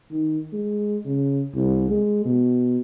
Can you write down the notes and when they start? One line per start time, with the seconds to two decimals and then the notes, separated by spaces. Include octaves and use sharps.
0.11 D#3
0.53 G#3
1.05 C#3
1.55 C2
1.89 G#3
2.25 B2